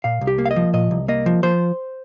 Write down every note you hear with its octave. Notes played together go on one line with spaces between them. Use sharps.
A#2 F5
C2
G4
A#3
F5
D#5
F3
A#2 D#5
C2
A#3 D#5
F3
F3 C5